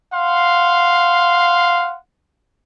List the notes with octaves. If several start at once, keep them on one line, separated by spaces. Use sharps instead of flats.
F5 F#5 C6